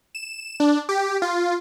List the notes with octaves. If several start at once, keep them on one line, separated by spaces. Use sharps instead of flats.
E7
D4
G4
F4